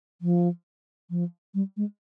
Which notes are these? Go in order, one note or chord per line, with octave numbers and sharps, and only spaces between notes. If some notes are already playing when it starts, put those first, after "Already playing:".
F3
F3
G3
G#3